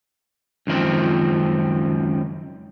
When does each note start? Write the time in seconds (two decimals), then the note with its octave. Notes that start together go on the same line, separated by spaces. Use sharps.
0.67 C#2 F#2 D#3 F3 C4